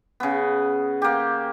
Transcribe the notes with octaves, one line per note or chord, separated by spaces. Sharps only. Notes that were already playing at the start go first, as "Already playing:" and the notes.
C#3 B3
A#3 G4